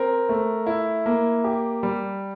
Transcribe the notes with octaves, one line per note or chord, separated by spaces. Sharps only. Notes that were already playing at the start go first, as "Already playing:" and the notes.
Already playing: C4 A#4
A3
E4
A#3
G4
G3